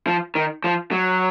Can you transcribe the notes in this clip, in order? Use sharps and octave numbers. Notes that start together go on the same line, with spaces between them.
F3
D#3
F3
F#3